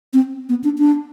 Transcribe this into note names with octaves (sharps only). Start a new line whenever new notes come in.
C4
B3
D4
D4